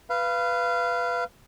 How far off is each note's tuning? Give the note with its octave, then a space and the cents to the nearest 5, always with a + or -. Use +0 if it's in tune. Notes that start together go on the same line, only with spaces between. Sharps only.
B4 +0 F5 -20